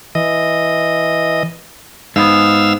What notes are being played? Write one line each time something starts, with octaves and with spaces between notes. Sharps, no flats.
E3 D#5
G#2 B3 F5 E6